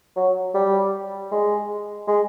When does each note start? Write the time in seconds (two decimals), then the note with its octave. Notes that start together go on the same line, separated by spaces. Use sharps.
0.16 F#3
0.54 G3
1.32 G#3
2.07 G#3